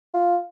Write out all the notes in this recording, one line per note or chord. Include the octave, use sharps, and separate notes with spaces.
F4